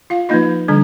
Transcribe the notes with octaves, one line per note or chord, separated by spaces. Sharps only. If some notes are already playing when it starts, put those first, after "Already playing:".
F4 F5
F3 A#3 D#4 F4 D#5
D3 G3 D4